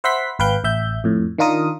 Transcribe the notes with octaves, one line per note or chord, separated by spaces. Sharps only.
C5 E5 F#5 B5 C6 B6
G#1 B4 F5 G5 G6
A1 E5 G6
F2 A2
D#3 D4 F4 A#4 D#6